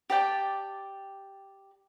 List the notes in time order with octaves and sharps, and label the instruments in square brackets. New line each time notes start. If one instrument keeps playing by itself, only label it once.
[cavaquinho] G4 D5 G5 A5